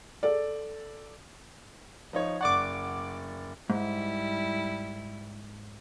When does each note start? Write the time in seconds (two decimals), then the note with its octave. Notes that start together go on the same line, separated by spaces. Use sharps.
0.23 A4 D5
2.13 F3 D#4 C#5
2.41 F#1 D5 F#5 C#6 D6
3.70 G#2 G3 E4